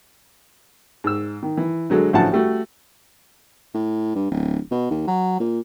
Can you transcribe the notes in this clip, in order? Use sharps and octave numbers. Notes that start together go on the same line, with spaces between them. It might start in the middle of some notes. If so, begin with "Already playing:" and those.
G#2 E6
D#3
E3
D3 F#3 G#3 A4
A1 D3 F3 F#3 F#5 A5
G3 A3 F#4
A2
G2
D1
B2
D#2
F#3
A#2